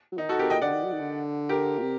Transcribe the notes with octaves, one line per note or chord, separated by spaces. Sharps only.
F#3
D#3 D#4
F#4 A4
C3 G4 A#4
A#2 D#5 G5
D3 D5 F#5
D#3
F#3
D#3
D3
G4 A#4
A#2
C3